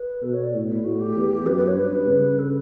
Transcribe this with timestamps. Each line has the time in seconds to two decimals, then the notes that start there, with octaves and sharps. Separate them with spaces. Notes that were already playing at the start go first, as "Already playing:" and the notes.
Already playing: B4
0.23 B2 A4
0.33 C#5
0.44 D5
0.55 A2
0.70 E4
0.84 A2 F#4
1.00 G4
1.16 E2
1.46 F#2 B4
1.57 B4
1.68 C#5
1.77 G2 B4
2.08 C#3
2.39 A4